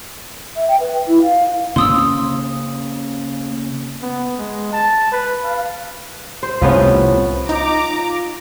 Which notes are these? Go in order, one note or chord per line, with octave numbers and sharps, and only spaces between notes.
E5
G5
B4
E4
F5
C#3 A#3 C4 C#4 C6 D#6 E6
B3
G#3
A5
B4
F5
C5
C2 A2 F3 B3 C#4
D#4 F4 A#5 D6